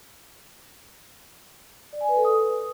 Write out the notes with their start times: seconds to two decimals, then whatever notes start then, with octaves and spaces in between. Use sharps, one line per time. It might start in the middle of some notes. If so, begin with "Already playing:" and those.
1.93 D5
2.01 G#5
2.09 B4
2.17 A4
2.25 D#6